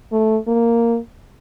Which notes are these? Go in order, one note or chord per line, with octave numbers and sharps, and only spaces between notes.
A3
A#3